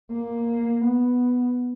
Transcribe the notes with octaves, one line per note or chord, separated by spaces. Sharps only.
A#3
B3